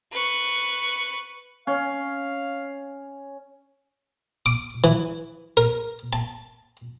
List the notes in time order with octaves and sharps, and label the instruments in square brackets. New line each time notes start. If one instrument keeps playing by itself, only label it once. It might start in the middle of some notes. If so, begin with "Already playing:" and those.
[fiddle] B4 C#6
[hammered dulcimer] C#4 [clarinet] F5
[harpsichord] D6
E3
A#4
A5